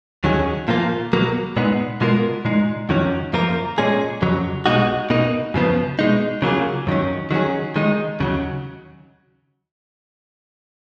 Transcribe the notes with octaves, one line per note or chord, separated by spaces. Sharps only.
D#2 D#3 F#3 C#4 G#4
A#2 F3 A#3 F4
B2 F#3 A#3
A#2 G#3 B3 D#4
B2 G#3 B3 F4 A#4
A#2 G#3 D#4
F2 D#3 F#3 C#4
F#2 F3 A#3 F4 A#4
A#2 G#3 C#4 G#4
F2 C#3 F#3
B1 B2 G#3 D#4 F#4
B2 A#3 D#4
F#2 C#3 F3 B3 F4
B2 G#3 D#4
C#3 F#3 A#3 F4 G#4
F#2 D#3 F#3 C#4
D#3 F#3 C#4 G#4
D#3 G#3 D#4
D#2 C#3 F#3